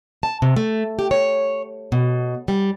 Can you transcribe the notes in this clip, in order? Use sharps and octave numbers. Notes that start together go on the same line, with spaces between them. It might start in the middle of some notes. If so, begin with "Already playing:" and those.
A5
C3
A3
G4
C#5
B2
G3